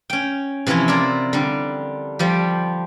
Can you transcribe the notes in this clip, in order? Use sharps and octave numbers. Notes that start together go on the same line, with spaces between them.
C#4 G5
C3 E3 F3 C#4 E4
E4 F4 A#4 D5 E5
D3 G3
F3 G3 G4